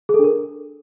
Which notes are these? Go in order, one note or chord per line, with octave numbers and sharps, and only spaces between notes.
G#4
A4
D4
A#4